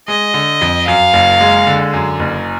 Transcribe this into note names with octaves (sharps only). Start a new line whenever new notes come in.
G#3 D#5
D3
F2
F#2 F5
F#1
G#3
D3
F#2
F#1